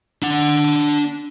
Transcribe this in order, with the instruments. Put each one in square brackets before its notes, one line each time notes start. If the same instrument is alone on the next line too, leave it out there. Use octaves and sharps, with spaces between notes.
[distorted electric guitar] D4 F#5